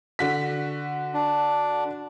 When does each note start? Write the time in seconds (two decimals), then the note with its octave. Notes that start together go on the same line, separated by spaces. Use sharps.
0.19 D3 F#4 B6
1.14 D4